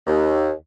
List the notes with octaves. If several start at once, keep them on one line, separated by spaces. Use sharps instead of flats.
D#2